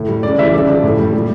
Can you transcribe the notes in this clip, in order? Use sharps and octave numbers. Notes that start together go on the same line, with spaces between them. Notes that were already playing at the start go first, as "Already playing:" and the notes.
Already playing: A2
G3
C#3 D5
E3 G3 E5
C#3 D5
F3
A2
G3
A#2